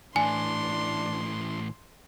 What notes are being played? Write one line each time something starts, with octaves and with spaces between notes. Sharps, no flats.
A2 E3 D4 G#5 C6